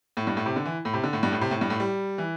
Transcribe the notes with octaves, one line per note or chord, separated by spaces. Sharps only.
A2
G2
A2
C3
D3
E3
A2
C3
D3
A2
G2
A2
C3
A2
G2
A2
G3
E3